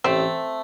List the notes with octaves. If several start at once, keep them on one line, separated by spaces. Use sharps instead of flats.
A1 A3 C4